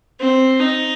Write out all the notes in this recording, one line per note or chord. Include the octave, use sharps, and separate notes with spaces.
C4
D#4